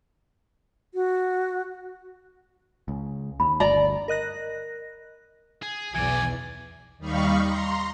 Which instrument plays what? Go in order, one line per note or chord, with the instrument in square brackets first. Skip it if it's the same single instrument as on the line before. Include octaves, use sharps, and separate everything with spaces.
[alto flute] F#4
[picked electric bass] C#2
[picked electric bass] D#2 [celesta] B5
[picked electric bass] G1 D2 [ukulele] D5 A#5
[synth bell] A#4 D#5 F#6 A#6
[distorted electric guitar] G#4
[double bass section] B1 E2 [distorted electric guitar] E3 D5 [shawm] G#5
[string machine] D#2 G3 D#4 F5 B5 C#6
A#5 C6